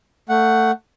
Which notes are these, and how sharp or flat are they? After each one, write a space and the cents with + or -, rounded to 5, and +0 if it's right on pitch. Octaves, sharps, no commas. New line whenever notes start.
A3 +20 F#5 +0